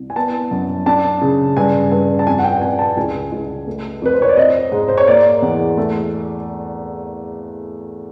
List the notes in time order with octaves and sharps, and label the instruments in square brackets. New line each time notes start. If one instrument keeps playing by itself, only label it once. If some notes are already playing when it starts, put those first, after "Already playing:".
Already playing: [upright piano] C2
G#5
B3 A5
F#2
D4 A5
C#3
G2 G#5
G2
A5
F2 G#5
F#5
G5
F2 G#5
A5
C#2 G#5
C#2
A3
F2 B4
C5
C#5
D5
C4 D#5
G#2
C5
C#5
A#3 D5
E2
A3